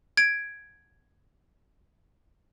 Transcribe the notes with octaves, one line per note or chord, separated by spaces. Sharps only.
G#6 D7